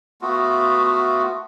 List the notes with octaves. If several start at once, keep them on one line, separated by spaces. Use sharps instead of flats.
A3 B3 F4 F#4